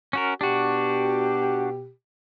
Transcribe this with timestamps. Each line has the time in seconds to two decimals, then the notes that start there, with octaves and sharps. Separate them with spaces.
0.13 C#4 F#4 A#4
0.41 B2 D4 F#4 G4